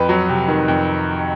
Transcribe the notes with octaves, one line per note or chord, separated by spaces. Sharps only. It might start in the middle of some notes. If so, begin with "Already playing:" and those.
Already playing: F2 B4
F#3
C3
D#3
F2